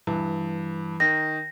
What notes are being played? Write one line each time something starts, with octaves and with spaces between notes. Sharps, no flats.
G2 E3
D#3 A#6